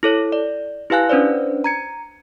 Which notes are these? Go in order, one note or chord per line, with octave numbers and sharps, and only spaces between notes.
E4 A4 C#5
D5
E4 G4 B4 F5 G#5 F#6
C#4 D4 B4 C5 D5
A#5 G#6 C#7